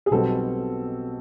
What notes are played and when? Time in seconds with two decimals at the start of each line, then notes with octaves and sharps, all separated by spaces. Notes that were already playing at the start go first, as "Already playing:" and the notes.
0.06 G#4
0.11 B1 B2 G3 C4 A4